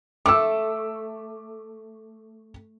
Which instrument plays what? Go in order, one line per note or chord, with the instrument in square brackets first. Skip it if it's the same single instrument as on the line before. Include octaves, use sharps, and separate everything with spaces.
[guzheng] A3 [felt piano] D6 E6